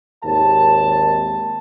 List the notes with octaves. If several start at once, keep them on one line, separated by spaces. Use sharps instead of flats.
G#1 D#2 A5